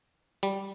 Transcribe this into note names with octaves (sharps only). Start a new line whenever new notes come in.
G3